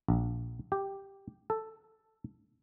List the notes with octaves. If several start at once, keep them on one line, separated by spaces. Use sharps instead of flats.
A#1
G4
A4